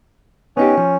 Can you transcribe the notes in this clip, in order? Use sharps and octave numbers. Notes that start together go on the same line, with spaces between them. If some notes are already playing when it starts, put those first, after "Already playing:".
B3 C#4 D#4 G4
F3